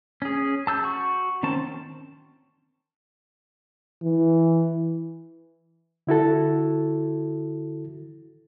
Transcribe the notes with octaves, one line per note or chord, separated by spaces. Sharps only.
C#4 G#4
A5 E6 G6
F#4 C#6
D#3 C4 C#4 A5
E3
D3 E4 F#4 A4